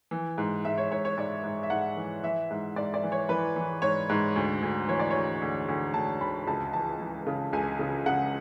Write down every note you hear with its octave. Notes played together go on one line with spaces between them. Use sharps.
E3
G#2
G#2 E5
C#5
G#2 C#5
C#5
G#2 D5
G#2
E5
G#2 F#5
E3
E3 E5
G#2
G#2 D5
D5
E3
C#5
E3 B4
E3
G#2 C#5
G#2
D2
D2
E3 C#5
D5
D2 C#5
D2
D2
D2 A5
D2 B5
C#2 A5
E3 A5
E3
C#3
C#2 G#5
C#3
C#3 F#5